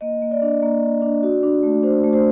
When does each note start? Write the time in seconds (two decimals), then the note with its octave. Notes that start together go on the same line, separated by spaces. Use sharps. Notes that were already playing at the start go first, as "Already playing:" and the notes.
0.01 A#3 D#5
0.22 A#3
0.31 D5
0.42 D4
0.62 A#3
0.83 D4
1.02 D4
1.23 F#4
1.43 D4
1.63 A3
1.83 D4 C5
2.04 A3
2.13 C5